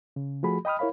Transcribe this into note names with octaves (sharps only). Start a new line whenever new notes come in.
C#3
F3 A3 F#4 G#4 B5
D#5 G5 B5 D#6 F6
E4 A#4 C#5 F5 B5